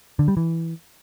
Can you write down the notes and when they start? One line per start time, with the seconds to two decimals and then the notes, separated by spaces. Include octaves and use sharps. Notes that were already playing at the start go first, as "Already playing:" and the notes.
0.19 D3
0.28 G3
0.37 E3